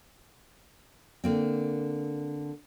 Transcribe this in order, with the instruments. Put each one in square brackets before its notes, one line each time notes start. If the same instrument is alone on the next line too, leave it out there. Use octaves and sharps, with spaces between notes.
[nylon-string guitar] D3 A#3 C4